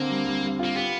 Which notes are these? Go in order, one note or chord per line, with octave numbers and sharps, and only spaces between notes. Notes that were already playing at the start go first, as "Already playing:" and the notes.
Already playing: D3 A#3 C4
G3
G3
G3
F4
A#3
B3 G4